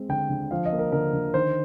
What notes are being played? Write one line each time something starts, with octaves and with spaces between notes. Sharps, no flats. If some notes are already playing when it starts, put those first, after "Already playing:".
Already playing: G#3 C4
D3 G5
D3
F3 F5
D#5
A#3
A#4
D3 A#4
D3
D#3 C5